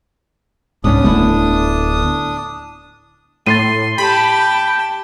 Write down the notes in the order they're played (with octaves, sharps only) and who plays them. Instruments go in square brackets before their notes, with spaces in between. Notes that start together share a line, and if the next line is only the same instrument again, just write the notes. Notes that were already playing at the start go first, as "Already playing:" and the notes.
[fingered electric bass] C2 G#2 [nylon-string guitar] B3 C#4 [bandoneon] D4 D#6
[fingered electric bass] D1 D3 B3 [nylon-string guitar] A3 E4
[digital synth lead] A2 [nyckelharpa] C6 [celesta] A6 C7 D#7
[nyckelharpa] G4 A5 [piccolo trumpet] G5 [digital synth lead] B5